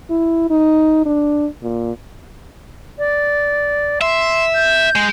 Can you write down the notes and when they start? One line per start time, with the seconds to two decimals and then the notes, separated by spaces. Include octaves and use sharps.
0.10 E4
0.50 D#4
1.06 D4
1.63 A#2
2.98 D5
4.01 E5 C6
4.55 G6
4.96 G#3